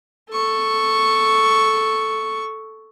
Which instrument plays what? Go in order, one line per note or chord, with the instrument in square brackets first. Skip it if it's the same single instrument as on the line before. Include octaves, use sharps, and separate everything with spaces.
[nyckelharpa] A4 C#6